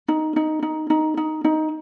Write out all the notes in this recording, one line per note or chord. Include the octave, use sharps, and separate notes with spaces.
D#4
D#4
D#4
D#4
D#4
D#4